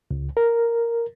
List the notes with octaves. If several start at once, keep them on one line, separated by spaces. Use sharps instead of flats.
C#2
A#4